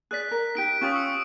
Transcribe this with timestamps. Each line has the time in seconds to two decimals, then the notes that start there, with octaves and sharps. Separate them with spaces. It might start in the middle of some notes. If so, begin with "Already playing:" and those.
0.11 G#4 D5 F#6 B6
0.31 A#4
0.55 D#4 G4 B6 D7
0.81 C#4 F4 G4 C#6 D#6
0.96 E6 C#7